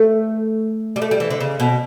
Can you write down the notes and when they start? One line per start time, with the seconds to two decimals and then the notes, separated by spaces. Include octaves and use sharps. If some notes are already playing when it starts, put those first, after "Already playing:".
Already playing: A3
0.96 G3
1.02 A3
1.11 G3
1.20 E3
1.30 D3
1.41 C#3
1.60 B2